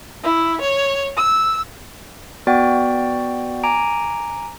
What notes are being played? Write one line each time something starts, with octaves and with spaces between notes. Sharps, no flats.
E4
C#5
E6
B3 F#4 D5 G5
G#5 A#5 D6 D7